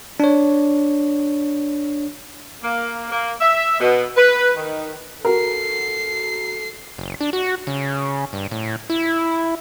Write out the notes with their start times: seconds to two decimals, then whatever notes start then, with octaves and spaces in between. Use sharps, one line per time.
0.20 D4 C#5
2.62 A#3
3.10 A#3
3.41 E5
3.80 B2
4.17 B4
4.56 D#3
5.25 F#4 A4 A#4 C7
6.98 F#1
7.21 D4
7.33 F#4
7.67 C#3
8.33 G2
8.51 A2
8.90 E4